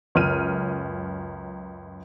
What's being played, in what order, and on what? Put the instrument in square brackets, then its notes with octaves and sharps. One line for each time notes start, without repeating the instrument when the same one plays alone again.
[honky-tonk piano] C#2 F#2 F6 D#7